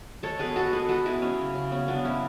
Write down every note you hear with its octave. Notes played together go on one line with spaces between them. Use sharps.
G#3 A4 C#5
B2 G#4 B4
B2 F#4 A4
B3 G#4 B4
G#3 F#4 A4
B2 E4 G#4
F#3 C#4
C#3
C#3
B3 C#4
F#3 B3 D4
C#3 C#4 E4